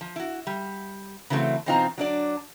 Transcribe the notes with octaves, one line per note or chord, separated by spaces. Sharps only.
F3
E4 F#4
G3
C#3 E3 F#3 A3 C4
B2 E3 C4 D#4 F4 A#5
F#3 D4 D5